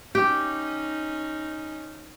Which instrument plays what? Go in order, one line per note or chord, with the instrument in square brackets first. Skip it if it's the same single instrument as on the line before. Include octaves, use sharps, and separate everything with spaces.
[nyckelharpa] C#4 D#4 [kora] G4